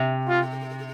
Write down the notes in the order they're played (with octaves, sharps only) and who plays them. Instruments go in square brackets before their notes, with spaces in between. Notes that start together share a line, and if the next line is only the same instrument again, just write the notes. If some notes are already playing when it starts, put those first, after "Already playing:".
Already playing: [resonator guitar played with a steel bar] C3
[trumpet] F4